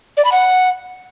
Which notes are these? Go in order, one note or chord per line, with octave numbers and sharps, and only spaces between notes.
D5
B5
F#5